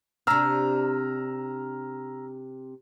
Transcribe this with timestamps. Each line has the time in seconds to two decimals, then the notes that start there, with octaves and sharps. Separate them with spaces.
0.27 C3 D4 A#5 E6 F6